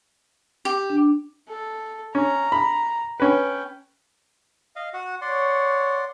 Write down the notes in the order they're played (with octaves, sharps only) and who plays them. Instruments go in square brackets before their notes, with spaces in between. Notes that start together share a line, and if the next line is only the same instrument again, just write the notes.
[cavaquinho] G4
[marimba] D4
[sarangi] A4
[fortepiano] C#4 [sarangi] A#5
[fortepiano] B5
[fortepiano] C#4 B4 [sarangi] G5
[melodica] D#5 F5
F#4 F#5
[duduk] C#5 [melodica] D5 F#5 C6